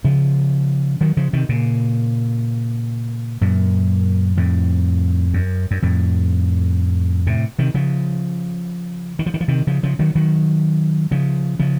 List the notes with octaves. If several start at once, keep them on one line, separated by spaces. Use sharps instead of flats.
C#3 F3
D#3 F#3
C#3 F3
C3 D#3
A#2 C#3
F#2 A#2
F2 A2
F#2
F#2
F2 A2
A2 C3
C3 D#3
C#3 F3
D#3
F3
D#3
F3
C3 D#3
C#3 F3
C#3 F3
D#3 F#3
D#3 F#3
C#3 F3
C#3 F3